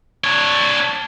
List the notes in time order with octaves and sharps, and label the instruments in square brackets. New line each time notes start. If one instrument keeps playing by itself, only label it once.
[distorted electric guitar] D4 C#5